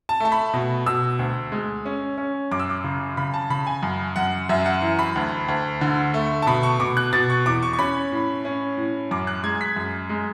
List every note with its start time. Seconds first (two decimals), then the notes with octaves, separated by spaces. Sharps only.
0.09 A5
0.20 A3 A5
0.32 B5
0.54 B2
0.86 B2 E6
1.19 D2
1.52 G#3
1.86 C#4
2.18 C#4
2.52 F#2 D6
2.59 E6
2.70 D6
2.84 C#3
3.17 C#3 B5
3.34 A5
3.50 C#3 B5
3.67 G#5
3.83 F#2
4.16 F#2 F#5
4.49 F#2 E5
4.66 F#5
4.82 E3
4.99 B5
5.16 D2
5.48 D2
5.81 D3
6.14 A3
6.42 A5
6.47 B2 B5
6.63 C#6
6.80 B2 D6
6.97 F#6
7.13 B2 A6
7.30 C#6
7.46 E2 D6
7.62 C#6
7.73 C#6
7.79 C#4 B5
8.12 A2
8.45 C#4
8.77 A2
9.11 F#2 D6
9.27 F#6
9.44 G#3 G#6
9.61 B6
9.76 F#2
10.09 G#3